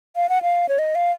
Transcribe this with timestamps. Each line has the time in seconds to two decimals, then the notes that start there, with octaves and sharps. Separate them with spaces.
0.16 F5
0.29 F#5
0.42 F5
0.69 C#5
0.79 D#5
0.95 F5